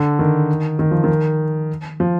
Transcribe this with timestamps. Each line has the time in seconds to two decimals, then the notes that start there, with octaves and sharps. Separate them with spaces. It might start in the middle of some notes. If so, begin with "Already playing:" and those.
Already playing: D3
0.19 D#3
0.79 D#3
0.91 F3
1.04 D#3
2.00 F3